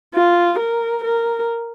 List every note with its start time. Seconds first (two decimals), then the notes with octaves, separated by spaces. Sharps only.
0.15 F4
0.59 A#4
1.04 A#4